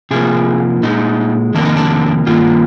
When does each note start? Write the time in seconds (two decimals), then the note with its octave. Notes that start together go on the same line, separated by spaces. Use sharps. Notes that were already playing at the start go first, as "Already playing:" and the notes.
0.11 C3 F3 A#3 G#4
0.83 A#2 G#3 D#4
1.55 F2 C3 D#3 A#3 D4
1.65 D#4
1.77 D4
2.26 G2 D#3 A#3 F4